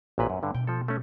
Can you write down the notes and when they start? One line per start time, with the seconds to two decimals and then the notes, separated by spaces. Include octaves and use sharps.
0.18 A1 A#2 B4
0.30 F#2
0.43 G2 D3
0.55 B2 G5
0.67 F3 A4
0.88 A3 C#4